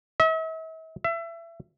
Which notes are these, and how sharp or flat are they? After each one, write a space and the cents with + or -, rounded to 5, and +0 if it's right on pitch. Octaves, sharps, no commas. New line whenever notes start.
E5 -45
E5 +25